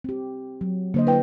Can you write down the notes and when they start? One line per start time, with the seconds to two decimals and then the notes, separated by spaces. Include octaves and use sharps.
0.04 C4 G4
0.61 F#3
0.94 D3 A#3 C5 D#5
1.07 E4 B4 G5